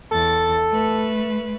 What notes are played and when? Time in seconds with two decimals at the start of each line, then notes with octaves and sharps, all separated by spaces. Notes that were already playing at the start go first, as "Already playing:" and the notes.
0.11 E2 A4 A6
0.71 A3 B4